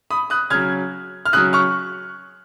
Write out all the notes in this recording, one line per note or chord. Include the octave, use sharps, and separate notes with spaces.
B5 D#6
D#6 F#6
C#3 F#3 F6 G#6
F6
C#3 F#3 D#6 F#6
C#6 F6